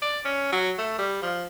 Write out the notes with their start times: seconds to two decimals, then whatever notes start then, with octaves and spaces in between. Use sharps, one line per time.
0.02 D5
0.25 C#4
0.52 F#3
0.78 A3
0.98 G3
1.22 F3